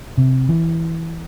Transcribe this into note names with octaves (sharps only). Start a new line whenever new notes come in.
C3
E3